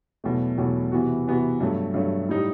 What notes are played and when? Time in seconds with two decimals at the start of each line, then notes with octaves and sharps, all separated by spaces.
0.24 E2 B2 F#3 A3
0.58 E2 B2 F#3 A3
0.92 C3 E3 B3 F#4
1.27 C3 E3 B3 F#4
1.61 G2 F#3 A3
1.94 G2 F#3 A3
2.29 A2 G3 D#4